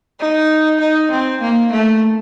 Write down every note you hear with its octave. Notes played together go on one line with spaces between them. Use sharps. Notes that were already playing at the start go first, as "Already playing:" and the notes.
D#4
D#4
C4
A#3
A3